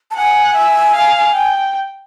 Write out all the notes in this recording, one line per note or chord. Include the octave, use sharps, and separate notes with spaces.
A5
F#5 G#5
E5
F5
G5